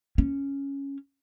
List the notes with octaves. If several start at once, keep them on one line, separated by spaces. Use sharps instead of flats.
C#4